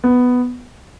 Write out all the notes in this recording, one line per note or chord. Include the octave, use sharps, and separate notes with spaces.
B3